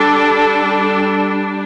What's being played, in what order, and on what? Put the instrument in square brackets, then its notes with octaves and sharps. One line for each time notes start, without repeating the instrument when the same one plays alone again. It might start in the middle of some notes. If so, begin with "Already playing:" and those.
Already playing: [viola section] G3 D4 A4